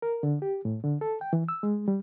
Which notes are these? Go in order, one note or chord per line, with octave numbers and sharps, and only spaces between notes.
A#4
D3
G4
A2
D3
A4
G5
E3
E6
G#3
G3